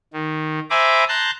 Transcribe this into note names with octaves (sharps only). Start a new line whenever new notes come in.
D#3
C5 E5 G#5 A#5 B5 D6
A5 A#5 C6 F#6 G6